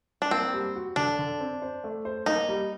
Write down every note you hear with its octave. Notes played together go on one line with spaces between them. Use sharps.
D4
A#3 C4
G3
F#4
D3 D4
D3
C4
C5
A3
C5
A#3 D#4
G3